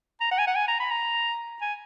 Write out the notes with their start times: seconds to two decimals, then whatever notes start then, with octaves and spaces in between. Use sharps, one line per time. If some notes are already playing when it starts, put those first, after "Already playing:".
0.21 A#5
0.31 F#5
0.39 G#5
0.47 F#5
0.56 G#5
0.68 A#5
0.80 B5
0.91 A#5
1.61 G#5